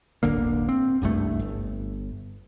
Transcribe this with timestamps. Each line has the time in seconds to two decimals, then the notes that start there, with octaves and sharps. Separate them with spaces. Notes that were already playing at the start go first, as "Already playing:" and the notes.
0.23 D1 G1 D3 A#3
0.69 C4
1.02 F#1 C2 G2 A3
1.39 G1